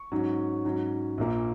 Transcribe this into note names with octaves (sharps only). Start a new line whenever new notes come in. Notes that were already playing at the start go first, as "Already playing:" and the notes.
Already playing: C#6
G#2 F#3 C#4
G#2 F#3 C#4
A#1 A#2 A#3